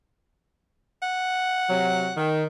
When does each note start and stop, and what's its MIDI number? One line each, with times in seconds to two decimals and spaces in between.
1.02 2.20 78
1.68 2.08 48
1.68 2.08 54
2.16 2.43 51